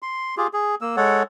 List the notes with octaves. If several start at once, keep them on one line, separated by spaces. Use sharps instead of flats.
C6
F4 G4 G#4
G#4
A#3 E6
G#3 A4 C#5 F#5